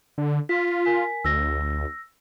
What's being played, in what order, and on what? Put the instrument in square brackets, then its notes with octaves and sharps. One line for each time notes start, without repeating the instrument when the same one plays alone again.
[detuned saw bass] D3
[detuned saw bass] F4 [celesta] B6
[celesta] A#4 G#5 B6
[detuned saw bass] D2 [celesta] E6 A#6